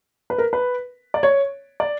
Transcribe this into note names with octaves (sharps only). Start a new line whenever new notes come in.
B4
A#4
B4
D5
C#5
D5